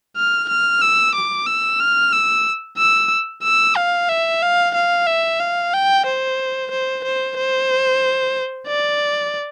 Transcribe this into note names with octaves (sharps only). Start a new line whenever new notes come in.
F6
F6
E6
D6
E6
F6
E6
E6
E6
F5
E5
F5
F5
E5
F5
G5
C5
C5
C5
C5
D5